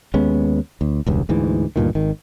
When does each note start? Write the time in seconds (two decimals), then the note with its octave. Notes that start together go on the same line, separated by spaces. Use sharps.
0.14 D#2 G#3 B3 C#4
0.81 D2
1.06 E1 C#2 G2
1.29 D2 G#2 E3
1.76 D2 G2 A#2 D#3
1.95 G#1 D#3